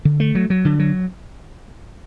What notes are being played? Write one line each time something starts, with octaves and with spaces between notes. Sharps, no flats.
D3
A3
F#3
F#3
D3
F#3